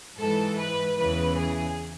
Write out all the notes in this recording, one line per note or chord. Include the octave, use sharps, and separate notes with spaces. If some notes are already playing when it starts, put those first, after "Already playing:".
G#2 E3 A4
B4
E2 C#3 E3 B4
G#4